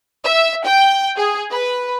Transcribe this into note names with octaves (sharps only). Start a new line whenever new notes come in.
E5
G5
G#4
B4